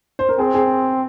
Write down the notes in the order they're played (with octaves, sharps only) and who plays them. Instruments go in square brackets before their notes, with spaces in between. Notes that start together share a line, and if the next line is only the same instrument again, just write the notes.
[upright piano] C5
A#4
[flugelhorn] C4 [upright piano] G#4
[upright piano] G#4